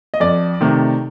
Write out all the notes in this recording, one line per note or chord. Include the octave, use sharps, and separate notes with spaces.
D#5
F2 D5
C3 D#3 A3